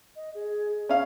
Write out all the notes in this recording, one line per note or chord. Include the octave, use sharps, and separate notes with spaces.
D#5
G#4
C#4 D4 F5